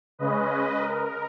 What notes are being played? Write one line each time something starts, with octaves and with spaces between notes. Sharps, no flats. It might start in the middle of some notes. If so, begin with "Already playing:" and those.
C#3 G#3 C#4 B4 D#5
A#4